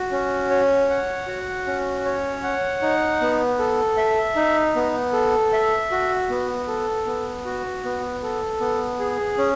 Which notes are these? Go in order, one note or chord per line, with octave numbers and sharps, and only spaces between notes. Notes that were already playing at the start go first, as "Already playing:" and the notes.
Already playing: F#4
C#4
C#5
F#5
F#4
C#4
C#5
F#5
D#4
B3
A4
E5
D#4
B3
A4
E5
F#4
B3
A4
B3
F#4
B3
A4
B3
G#4
C#4